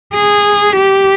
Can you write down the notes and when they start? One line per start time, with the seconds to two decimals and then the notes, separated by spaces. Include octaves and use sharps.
0.14 G#4
0.77 G4